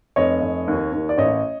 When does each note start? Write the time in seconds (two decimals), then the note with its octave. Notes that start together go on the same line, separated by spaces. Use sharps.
0.16 F1 C#5 D#5
0.41 F1
0.68 D#2
0.93 D#2
1.09 D5
1.18 A1 C#5 D#5